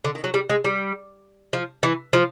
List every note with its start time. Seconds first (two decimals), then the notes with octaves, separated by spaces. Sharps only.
0.04 D3
0.15 D#3
0.24 F#3
0.34 G3
0.50 G#3
0.64 G3
1.53 F3
1.83 E3
2.13 F3